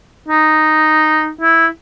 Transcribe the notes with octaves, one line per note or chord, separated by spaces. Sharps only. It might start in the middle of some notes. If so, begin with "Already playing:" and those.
D#4
E4